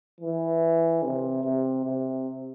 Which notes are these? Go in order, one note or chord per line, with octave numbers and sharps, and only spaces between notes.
E3
C3
C3
C3